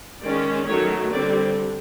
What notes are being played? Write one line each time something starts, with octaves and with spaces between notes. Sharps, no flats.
D#3 G#3 C#4 D5
D#3 F#3 A3 C#5
D3 G3 C4 D5